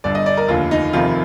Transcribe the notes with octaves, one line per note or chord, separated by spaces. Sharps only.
G1 G2 D3 D5
D#5
D5
A#4
F1 D#2 D3 F4
D#4
F1 F2 C3 D#3 F4